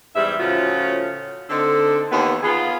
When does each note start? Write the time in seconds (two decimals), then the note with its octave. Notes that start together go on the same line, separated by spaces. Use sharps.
0.15 E2 G#2 G3 E5
0.40 A2 C#3 F3 C#4 F4 F#4
1.50 D3 C4 D#4 A4
2.12 D#2 E3 B3
2.43 B3 F4 G#4